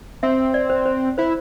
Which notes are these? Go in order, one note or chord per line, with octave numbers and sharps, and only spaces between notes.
C4 E5
D5
C5
C5
E4 C5